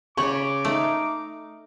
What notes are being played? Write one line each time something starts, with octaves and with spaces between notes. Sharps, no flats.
C#3 C#5 B5 C#6 D6
A3 D#4 F5